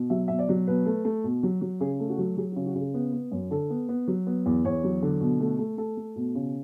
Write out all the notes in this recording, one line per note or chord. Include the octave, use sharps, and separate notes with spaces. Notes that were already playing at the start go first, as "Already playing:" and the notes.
Already playing: B2
F#3 E5
B2 E5
D5
F#3
B2 B4
A3
A3
B2
F#3
F#3
C#3 G#4
A3
F#4
F#3
F#3 G#4
F#4
C#3
F#4
C#3
G#4
B3
B3
F#2
D3 A4
B3
B3
F#3
B3
E2
E2 C#5
F#3
D3
B2
A3
A3
A3 A4
A3
B2
C#3